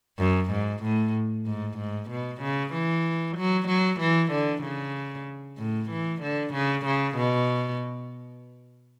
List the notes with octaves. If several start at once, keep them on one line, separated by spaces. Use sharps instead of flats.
F#2
G#2
A2
G#2
G#2
B2
C#3
E3
F#3
F#3
E3
D3
C#3
A2
E3
D3
C#3
C#3
B2